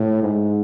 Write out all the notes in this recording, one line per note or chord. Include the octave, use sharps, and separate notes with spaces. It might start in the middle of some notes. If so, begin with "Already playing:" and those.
Already playing: A2
G#2